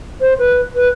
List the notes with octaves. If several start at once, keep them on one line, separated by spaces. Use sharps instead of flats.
C5
B4
B4